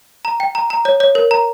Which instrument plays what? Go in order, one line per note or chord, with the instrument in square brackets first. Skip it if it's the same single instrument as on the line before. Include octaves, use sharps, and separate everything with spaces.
[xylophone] A#5
G5
A#5
A#5
C#5
C#5
A#4
A#5